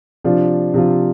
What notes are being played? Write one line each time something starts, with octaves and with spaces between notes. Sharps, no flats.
C3 F3 D4 F4
C3 F3 D4 F4